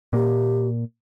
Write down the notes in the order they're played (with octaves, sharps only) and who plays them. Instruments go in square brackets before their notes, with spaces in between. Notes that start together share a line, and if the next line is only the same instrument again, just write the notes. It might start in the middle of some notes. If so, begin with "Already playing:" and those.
[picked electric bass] A#2 A#3 [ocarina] G4